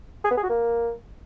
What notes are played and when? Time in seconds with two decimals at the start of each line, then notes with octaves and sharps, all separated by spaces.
0.25 G#4
0.31 B3
0.37 G#4
0.43 F#4
0.50 A#3